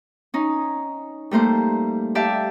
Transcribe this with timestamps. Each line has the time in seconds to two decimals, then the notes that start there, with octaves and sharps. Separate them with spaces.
0.34 C#4 D#4
1.31 G3 A3 A#3 C5
2.15 G4 D5 E5 F5 G5 A5